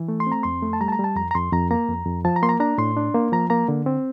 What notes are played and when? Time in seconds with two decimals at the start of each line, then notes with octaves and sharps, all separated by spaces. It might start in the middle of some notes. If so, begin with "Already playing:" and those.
Already playing: E3
0.08 A3
0.20 C6
0.27 C4
0.32 A#5
0.43 F2 C6
0.63 A3
0.73 A5
0.81 G3 A#5
0.88 A5
0.92 A#5
0.99 G3
1.04 A5
1.16 F2 A#5
1.31 A#5
1.34 F2 C6
1.53 F2 A#5
1.71 A#3 A#5
1.89 F2
2.06 F2
2.25 F3 A5
2.36 A#5
2.43 A#3 C6
2.49 A#5
2.60 D4 A#5
2.78 A2 C6
2.97 D4
3.14 A#3
3.32 F3 A#5
3.50 A#3 A#5
3.68 D3
3.86 C4